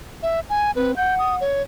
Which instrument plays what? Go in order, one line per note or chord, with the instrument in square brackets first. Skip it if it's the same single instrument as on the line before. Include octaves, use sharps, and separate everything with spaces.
[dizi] E5
G#5
[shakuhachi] C4 [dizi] B4
[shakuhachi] F#5 [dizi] G6
[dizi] D#6
C#5